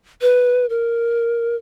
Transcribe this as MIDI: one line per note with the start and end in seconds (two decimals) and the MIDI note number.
0.21 0.66 71
0.70 1.56 70